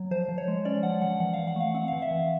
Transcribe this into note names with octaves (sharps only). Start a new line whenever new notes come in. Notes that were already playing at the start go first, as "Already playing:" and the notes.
Already playing: F#3
F3 C5
F3
C#5
G#3
C#4 D5
F3 F#5
F3 F#5
E3 F#5
E3 F5
F#5
A3 F5
C4 F#5
E3 F5
E5
E3